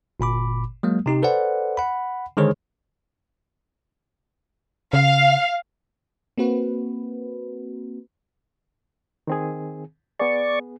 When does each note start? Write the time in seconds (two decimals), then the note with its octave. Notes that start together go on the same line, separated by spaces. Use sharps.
0.20 G1 A#2 B5 D6
0.83 F#3 G#3 A#3
1.06 C3 D#4 G4
1.23 A4 B4 C5 D5 F#5
1.77 F#5 B5
2.37 D3 D#3 G#3 G#4 C5 C#5
4.93 C#3 F5
6.38 A#3 C4 F#4 B4
9.27 D#3 C4 G#4
10.19 B3 G#4 D5 C#6